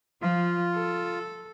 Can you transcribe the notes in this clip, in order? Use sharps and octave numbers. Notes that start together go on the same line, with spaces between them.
F3 F4
A4